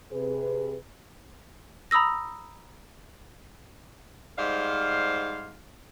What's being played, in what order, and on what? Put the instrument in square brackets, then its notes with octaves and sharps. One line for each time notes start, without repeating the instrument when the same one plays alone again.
[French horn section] C3 G#4 B4
[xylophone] A#5 B5 D#6 E6 A#6
[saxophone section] G#2 G3 C5 F5